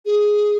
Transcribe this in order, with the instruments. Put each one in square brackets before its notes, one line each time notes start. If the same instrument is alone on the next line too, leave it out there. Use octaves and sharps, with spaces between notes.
[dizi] G#4